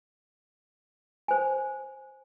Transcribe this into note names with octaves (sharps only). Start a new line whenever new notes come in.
C5 G#5